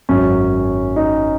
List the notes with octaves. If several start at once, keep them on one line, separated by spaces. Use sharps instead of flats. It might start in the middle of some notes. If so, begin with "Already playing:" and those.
G#1 F#2 F#3 C#4
D#4